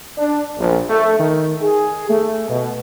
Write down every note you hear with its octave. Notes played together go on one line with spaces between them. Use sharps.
D4
A#1
A3
D#3
G#4
A3
B2